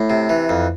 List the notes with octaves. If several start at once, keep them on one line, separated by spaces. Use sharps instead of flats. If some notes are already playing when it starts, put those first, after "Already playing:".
Already playing: A2
C3
E3
F2